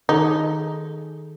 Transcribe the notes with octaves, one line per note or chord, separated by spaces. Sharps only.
D#3 D#4 G#4 A4